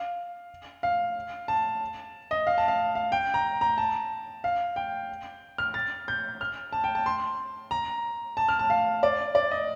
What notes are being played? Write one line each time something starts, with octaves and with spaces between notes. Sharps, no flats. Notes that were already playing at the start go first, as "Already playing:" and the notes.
Already playing: F5
F5
A5
D#5
F5
A5
F5
F5
G5
A#5
A#5
A5
F5
G5
F6
A6
G6
F6
A5
G5
A5
C6
A#5
A5
F6
A5
F5
D5
D5
D#5